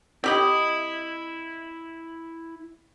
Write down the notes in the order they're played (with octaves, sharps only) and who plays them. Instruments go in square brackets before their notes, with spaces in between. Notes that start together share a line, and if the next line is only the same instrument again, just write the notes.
[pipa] C4 G4 D#5 [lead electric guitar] E4 B5